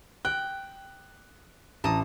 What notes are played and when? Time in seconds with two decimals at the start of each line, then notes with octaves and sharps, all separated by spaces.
0.25 G5 F#6
1.84 A1 A5 A#5 D#6